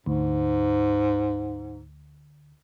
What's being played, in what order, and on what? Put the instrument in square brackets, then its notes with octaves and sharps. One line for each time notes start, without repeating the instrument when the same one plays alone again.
[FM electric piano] D2 [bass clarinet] G#2